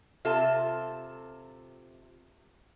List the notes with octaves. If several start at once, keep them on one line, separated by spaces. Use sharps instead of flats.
C3 F4 A4 E5